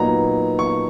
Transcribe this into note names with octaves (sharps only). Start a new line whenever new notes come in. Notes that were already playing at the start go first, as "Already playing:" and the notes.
Already playing: A#2 F#3 B3 D#4 A#5
C#6